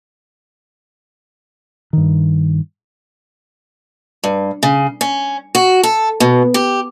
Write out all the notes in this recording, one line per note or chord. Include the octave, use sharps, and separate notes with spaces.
G2 D#3
G2
C#3
C#4
F#4
A4
B2
G4